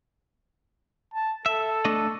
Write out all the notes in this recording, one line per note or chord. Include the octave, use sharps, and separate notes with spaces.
A5
A4 E5
A3 D4 D#5